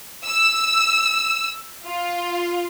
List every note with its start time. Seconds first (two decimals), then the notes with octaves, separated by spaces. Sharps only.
0.26 E6
1.87 F4